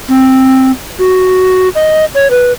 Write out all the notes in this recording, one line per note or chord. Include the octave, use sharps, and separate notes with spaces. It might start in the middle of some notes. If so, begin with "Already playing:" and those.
C4
F#4
D#5
C#5
B4